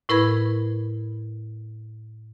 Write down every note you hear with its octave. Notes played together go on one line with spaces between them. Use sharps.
A2 E4 A#4 B4 B5 G#6